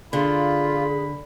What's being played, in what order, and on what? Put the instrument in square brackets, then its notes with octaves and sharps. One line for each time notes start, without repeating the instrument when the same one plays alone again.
[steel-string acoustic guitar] D3 [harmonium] F4 [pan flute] G#4 [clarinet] B5